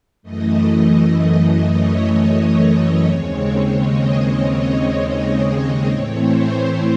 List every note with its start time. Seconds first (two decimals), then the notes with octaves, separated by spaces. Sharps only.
0.23 F#2 E3 A3 D#5
1.64 C#5
2.35 D#5
3.07 D#2 C#3 G#3 C4 C#5
3.77 D#5
5.90 A2 E3 A3 C4 C#5
6.26 C5
6.61 C5